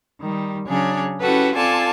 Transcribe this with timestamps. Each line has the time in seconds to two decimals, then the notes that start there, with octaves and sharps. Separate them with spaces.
0.19 D#3 G3
0.67 C#3 F#3 C#4 D4 G#4 C#5
1.20 C#4 E4 F#4 G4 A4 B4
1.54 C4 F4 A4 D5 G#5 A5